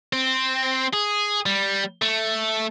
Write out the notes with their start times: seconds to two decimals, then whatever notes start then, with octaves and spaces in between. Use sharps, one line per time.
0.13 C4
0.93 G#4
1.46 G3
2.02 A3